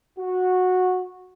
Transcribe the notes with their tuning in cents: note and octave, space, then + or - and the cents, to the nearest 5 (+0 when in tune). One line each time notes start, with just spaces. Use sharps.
F#4 -15